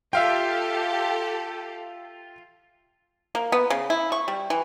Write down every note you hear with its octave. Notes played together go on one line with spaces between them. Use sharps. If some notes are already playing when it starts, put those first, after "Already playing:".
F4 G4 A4 E5 F5 G5
A#3
B3
C#3
E4
C#6
G3
E3